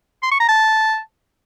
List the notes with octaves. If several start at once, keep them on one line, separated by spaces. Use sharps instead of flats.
C6
C#6
A#5
A5